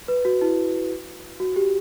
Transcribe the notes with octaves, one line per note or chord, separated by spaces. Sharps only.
B4
F#4
E4
F#4
G4